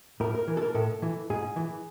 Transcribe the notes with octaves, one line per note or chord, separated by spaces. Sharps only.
A2 A#4
A#4
E3
A4
A#4
A2 A4
E3
G#2 G#4
E3